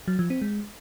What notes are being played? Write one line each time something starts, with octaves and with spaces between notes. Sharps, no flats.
F#3
F3
C4
G#3